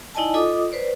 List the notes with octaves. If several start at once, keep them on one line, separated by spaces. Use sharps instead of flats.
D#4 E4 D5 D#5 G#5 A5
F4 A4 D#5 D6 D#6
B4 C5 D5